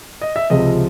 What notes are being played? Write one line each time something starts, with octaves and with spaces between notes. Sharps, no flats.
D#5
E5
C#2 C3 F3 G#3 D#5